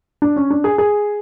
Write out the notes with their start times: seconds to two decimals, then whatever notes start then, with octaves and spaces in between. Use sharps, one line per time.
0.22 D4
0.36 C#4
0.50 D4
0.64 G#4
0.78 G#4